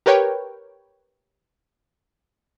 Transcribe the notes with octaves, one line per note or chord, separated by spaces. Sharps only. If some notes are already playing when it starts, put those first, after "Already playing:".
G4 A#4 B4 C#5 G5